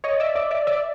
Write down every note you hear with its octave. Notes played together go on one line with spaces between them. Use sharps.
C#5 D#5
D5 E5
D5 E5
D5 E5
D5 E5